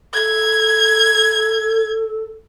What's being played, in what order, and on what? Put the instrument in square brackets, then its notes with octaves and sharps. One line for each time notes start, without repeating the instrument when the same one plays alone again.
[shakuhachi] A4 [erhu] G#6